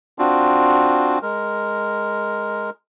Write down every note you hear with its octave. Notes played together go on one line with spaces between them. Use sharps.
C4 D4 F4 F#4
G#3 A#4